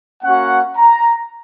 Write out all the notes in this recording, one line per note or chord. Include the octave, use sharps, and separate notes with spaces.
A#3 C#4 F#4 F#5
A#5